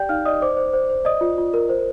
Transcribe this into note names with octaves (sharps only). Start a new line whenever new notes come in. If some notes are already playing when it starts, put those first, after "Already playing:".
Already playing: G4 D5 G5 G6
D#4 F5 F6
D5 D#5 D#6
C5 D5 D6
C5
C5
C5
D5 D#5 D#6
F4
F4
A#4
C5